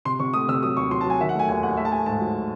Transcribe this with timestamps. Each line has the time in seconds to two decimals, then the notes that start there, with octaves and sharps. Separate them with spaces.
0.05 C3 C6
0.20 C3 C#6
0.34 A3 D#6
0.48 C3 E6
0.63 F#3 D#6
0.77 D#2 C#6
0.91 F#3 C6
1.01 A5
1.06 F#3 G#5
1.20 D#3 E5
1.29 F#5
1.35 A3 G#5
1.49 D#2 G#5
1.63 D#2 F#5
1.77 A3 E5
1.85 A5
1.92 A3 G#5
2.06 G#2 A5
2.20 F#3